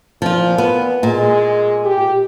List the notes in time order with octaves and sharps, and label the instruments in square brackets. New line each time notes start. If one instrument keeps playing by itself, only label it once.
[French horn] A#2 [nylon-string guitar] F3 F4
[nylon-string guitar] B3
[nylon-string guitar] A#2 [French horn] G#3
[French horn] G4